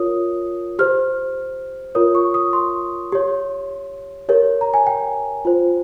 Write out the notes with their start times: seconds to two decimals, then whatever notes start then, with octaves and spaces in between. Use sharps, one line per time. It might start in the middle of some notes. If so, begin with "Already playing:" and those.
Already playing: F4 A#4 C#5 D#6
0.79 G4 C5 F6
1.95 F4 A#4 C#5 D#6
2.15 C#6
2.34 D#6
2.53 C6
3.12 G4 C#5
4.29 G4 A#4 C#5
4.61 A#5
4.74 G#5
4.87 G5
5.45 F4 C5